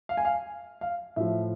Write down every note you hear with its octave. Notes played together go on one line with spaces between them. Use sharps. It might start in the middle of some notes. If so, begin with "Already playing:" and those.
F5
G#5
F5
F5
A2 F3 E5